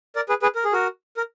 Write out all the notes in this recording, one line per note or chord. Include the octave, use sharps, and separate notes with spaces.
A#4 D5
G#4 B4
G#4 B4
A#4
G#4
F#4 A#4
A#4